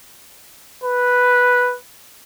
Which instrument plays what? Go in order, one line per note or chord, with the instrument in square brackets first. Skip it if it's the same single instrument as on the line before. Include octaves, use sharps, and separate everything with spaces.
[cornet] B4